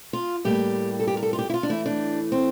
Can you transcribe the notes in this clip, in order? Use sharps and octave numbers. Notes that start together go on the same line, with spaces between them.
F4
A2 G3 A#3 G4
A4
G4
A#4
A4
F4
G4
E4
F4
D4
A2 E3 A3 E4
D4
C4